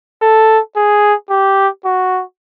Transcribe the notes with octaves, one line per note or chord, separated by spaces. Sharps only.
A4
G#4
G4
F#4